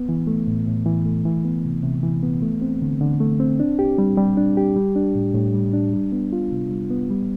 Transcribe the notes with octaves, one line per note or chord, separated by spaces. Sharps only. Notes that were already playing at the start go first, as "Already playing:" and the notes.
Already playing: B3
E3
A3
A2
A2
E3
A3
E3
B3
C3
C3
E3
B3
A3
C4
D3
D3
A3
C4
D4
G4
G3
G3
D4
G4
G3
D4
A2
A2
G3
D4
G3
B3
F4
C3
G3
B3
G3